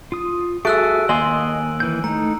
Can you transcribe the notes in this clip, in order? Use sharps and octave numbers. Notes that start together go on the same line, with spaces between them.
F4 D#6
F#4 G#4 A4 E5 G#5 E6 F#6 D7
D#2 A#3 D#5 G#5 C6 D#6 E6 F#7
E3 G6
A3 D#4 A#5